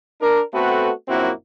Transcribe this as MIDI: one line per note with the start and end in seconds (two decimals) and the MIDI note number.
0.22 0.41 62
0.22 0.41 70
0.54 0.91 57
0.54 0.91 59
0.54 0.91 60
0.54 0.91 66
0.54 0.91 69
0.54 0.91 71
1.08 1.31 34
1.08 1.31 42
1.08 1.31 58
1.08 1.31 60
1.08 1.31 64
1.08 1.31 66